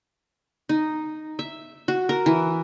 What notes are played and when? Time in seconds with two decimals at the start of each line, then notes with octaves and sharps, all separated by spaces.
0.69 D#4
1.39 E5
1.88 F#4
2.09 A#4
2.26 E3